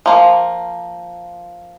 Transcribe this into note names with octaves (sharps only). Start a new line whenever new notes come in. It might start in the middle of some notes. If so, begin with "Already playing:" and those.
F3 A#3